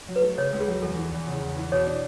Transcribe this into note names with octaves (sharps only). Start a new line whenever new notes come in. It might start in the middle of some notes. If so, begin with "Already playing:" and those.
F#3
B4
A3
C#3 C#5
C#2
G#4
F#3
E2 A4
E3
E2
C#3
E2
E3
B2 C#5
D4